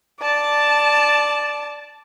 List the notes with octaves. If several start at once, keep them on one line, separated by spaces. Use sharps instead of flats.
D5 A5